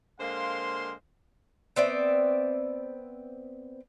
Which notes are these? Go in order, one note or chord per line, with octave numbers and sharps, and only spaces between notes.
D3 G#3 A#3 C5 F5 C6
B3 C4 D5 E5